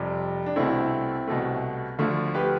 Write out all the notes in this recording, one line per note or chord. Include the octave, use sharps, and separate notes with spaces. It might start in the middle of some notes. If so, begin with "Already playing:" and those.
Already playing: F2 C3 G3
D4
C2 B2 A3 C4 E4
C2 B2 A3
D2 D3 F3 A3
G4 B4